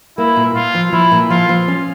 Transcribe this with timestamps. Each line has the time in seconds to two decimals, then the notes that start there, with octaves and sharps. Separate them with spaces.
0.18 A#3 E4
0.36 A#2
0.55 A#2 F4
0.75 F3
0.93 F3 E4
1.12 A#2
1.30 F3 F4
1.49 F3
1.68 C#4